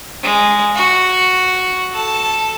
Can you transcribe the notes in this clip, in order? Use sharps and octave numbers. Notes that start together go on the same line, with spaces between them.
G#3
F#4
A4 A5